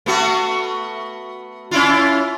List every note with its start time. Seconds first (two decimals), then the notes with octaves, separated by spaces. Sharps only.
0.06 A3 B3 F#4
1.71 C#4 E4 F4